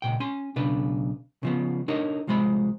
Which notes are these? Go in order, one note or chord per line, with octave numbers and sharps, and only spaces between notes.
C#2 A#2 G5
C#4 G#5 C6
B1 C#3 D4 B4
C#3 F3 B3
D4 D#4 A#4 C#5 D#5
C2 F3 G#3 C5 B5